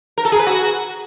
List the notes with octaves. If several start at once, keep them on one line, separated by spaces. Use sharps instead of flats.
A#4
A4
G#4
B4
F#4